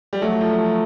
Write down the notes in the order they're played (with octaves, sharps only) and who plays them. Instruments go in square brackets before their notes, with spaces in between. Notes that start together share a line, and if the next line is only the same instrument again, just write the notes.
[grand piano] G3
[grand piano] F#3 [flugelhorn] A3
[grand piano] F3